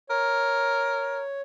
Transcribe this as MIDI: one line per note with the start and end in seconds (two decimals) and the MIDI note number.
0.10 1.21 70
0.10 1.41 73